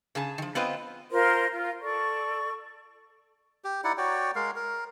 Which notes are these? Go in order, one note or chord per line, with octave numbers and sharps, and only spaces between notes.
C#3 G#4 A5
D#3 F3
B3 C4 F4 B4 D#5
F4 A#4 C5 C6
F4
A4 D5 C#6
G4
D#4 E4 D5 F#5
F#4 C#5 D5 G5
G#3 A#4 F5
A#4